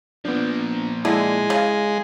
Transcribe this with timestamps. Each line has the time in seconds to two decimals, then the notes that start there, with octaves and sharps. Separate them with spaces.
0.25 A#2 F3 B3 D4
1.05 D3 G#3 E4
1.50 C#3